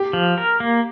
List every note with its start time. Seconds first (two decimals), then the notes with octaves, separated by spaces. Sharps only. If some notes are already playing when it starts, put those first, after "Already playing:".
Already playing: G4
0.13 F3
0.38 A#4
0.60 A#3